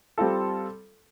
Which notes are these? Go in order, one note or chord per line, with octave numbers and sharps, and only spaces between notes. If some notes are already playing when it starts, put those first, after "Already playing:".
G3 C4 F4 A4